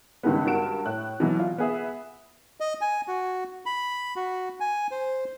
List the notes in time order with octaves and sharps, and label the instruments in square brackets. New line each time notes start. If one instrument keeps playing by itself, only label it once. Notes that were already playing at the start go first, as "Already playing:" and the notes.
[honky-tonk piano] C#2 G2 D#3 G#3 B3
G2 F#4 A#4 D7 E7
A2 F#6
B2 E3 F#3
F4
B3 G#4 E5
[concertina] D#5
G#5
F#4
B5
F#4
G#5
C5